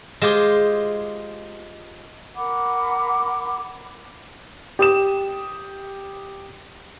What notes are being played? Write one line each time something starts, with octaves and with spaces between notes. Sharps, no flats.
G#3 F4 G4 G#4 C5
A#4 F#5 B5 D6
G4 D#6 E7